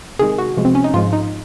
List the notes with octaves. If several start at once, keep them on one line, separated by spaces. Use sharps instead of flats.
C3 D#3 G#3 G#4
F#4
C3 F3 G#3
C4
C#4
D#4
G#2 F3 G#3 F4
D#4